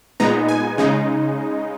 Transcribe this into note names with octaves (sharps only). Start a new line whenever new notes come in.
A#2 G#3 B3 D#4 A#5
G#5
C#3 G#3 D#4